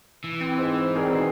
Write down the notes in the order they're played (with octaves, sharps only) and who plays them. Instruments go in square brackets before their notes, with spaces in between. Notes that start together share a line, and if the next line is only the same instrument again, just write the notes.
[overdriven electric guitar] E3
[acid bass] C4
[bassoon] G#2 [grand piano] C5
[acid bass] C4 [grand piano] G#4 A#4 D5
[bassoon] B2 [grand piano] D#3 C7